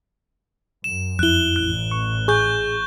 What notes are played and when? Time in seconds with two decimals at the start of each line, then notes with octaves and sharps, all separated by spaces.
0.84 F#2 E7
1.19 F2 E4 F#6 G7
1.56 A1 F#6
1.91 C#6
2.28 G#4 C#6 G6 G7